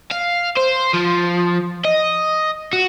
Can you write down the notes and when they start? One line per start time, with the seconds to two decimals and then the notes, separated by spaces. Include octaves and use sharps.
0.12 F5
0.57 C5
0.94 F3
1.85 D#5
2.73 F#4